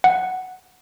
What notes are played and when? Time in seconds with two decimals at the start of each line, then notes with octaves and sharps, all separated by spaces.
0.04 F#5